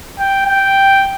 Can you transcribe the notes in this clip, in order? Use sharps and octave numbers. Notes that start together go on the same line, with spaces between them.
G5
G5